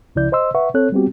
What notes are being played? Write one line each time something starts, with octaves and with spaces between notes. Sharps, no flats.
C#2 C#3 F3 E4 D5 G6
C5 D#5 C6 E6
B4 E5 F#5 C#6
C4 A4 C#5 F#6
G3 B3 C4 F#4 G4